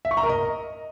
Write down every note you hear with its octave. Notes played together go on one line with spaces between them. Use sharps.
E5
C#6
A#5
A#4
D#5